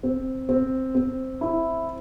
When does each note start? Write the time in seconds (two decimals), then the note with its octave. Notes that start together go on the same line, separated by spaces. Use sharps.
0.03 C4
0.49 C4
0.95 C4
1.41 E4